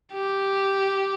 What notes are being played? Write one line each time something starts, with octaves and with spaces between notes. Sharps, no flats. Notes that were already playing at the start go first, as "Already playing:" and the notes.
G4